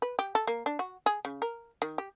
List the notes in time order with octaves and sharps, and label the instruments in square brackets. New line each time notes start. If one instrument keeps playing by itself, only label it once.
[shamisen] B4
G4
A4
A#3
D4
F#4
G#4
C#3
A#4
D#3
G4